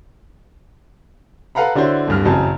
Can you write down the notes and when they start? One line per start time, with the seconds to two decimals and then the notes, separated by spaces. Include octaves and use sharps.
1.55 A4 B4 F5 F#5 A#5 B5
1.75 D3 D4 E4 F#4 C5 C#5
2.08 D1 G2 F6
2.25 A1 F#2 C#3 F#3 C4 A5